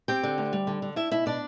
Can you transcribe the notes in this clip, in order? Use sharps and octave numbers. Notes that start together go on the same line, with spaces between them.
C4 G4 G5
D3
D2
G3
D3
D3
D4 E4 E5
B2 E4 E5
B2 D4 D5